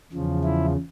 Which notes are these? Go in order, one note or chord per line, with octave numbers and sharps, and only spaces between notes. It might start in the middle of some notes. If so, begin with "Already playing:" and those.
E2 C#3 F3
E4